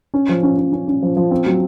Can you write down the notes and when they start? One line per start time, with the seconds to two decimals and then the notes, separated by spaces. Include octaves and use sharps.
0.14 C#4
0.29 F3
0.43 C#4
0.58 C#4
0.72 C#4
0.88 C#4
1.03 F3
1.17 F3
1.31 C4
1.46 F#3